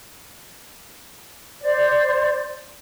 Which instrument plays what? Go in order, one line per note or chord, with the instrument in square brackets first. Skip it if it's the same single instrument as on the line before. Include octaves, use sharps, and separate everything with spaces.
[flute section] C5 D5